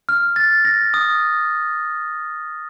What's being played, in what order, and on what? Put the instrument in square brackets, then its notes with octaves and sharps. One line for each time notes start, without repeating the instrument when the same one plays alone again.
[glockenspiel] F6
A6
A#6
D#6